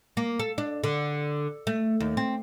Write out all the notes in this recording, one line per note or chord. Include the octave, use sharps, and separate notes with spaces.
A#3
A4
D4
D3
A3
D#2
C4